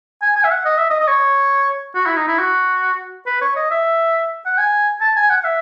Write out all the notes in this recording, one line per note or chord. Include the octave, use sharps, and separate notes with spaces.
G#5
G#5
E5
F#5
D#5
E5
D#5
D#5
C#5
F#4
E4
D#4
E4
F#4
B4
C#5
D#5
E5
F#5
G#5
A5
G#5
F#5
F#5
E5